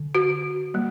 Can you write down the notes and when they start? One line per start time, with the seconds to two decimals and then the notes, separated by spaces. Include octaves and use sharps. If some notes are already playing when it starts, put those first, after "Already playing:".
Already playing: D3
0.15 F#4
0.74 G3 A#3